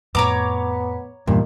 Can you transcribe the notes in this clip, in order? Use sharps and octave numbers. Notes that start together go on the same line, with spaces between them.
F2 A2 B3 C#5 A#5 D6
E2 G2 A#2 D#3